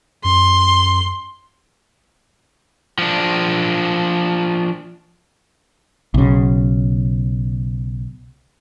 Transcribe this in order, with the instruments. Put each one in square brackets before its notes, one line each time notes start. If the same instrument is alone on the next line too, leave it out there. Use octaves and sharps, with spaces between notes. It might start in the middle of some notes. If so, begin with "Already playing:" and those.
[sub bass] F#2 [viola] C6
[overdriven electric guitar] F3 D4
[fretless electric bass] B1 C#3